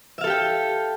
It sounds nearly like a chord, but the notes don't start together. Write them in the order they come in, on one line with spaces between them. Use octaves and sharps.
E5 F5 A4 G4 G5